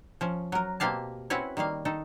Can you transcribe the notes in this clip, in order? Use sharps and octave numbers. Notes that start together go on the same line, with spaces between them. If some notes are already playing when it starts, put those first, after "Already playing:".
F3 C#4
F#3 A#4
B2 A#3 C4 G4 F5 A5
C4 C#4 E4 F#4 B4 C#5
D#3 G3 A#3 F5
D#3 D#4 A4